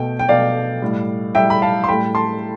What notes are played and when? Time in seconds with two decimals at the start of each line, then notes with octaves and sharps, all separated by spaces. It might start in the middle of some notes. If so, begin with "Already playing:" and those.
Already playing: B2 A3 G5
0.19 G5
0.29 B2 A3 D5 F5
0.82 A2 G3
1.35 A2 G3 E5 G5
1.50 B5
1.62 F5 A5
1.84 C6
1.88 A2 G3 G5 B5
2.15 A5 C6